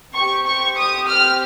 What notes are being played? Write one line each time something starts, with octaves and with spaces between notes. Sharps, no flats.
C4 G4 C#6
C#6
D#6
F6